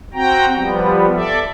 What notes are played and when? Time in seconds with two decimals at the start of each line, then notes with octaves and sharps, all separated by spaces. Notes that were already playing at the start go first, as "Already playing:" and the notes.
0.14 C4 F#4 G5 A#5
0.53 F3 G3 B3
1.12 A4 D5 E5